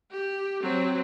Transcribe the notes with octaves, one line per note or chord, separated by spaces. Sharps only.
G4
F#3 C4